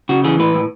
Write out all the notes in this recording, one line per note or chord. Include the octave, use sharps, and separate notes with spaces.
C#3 F#4
E3 G#4
A2 B4
A2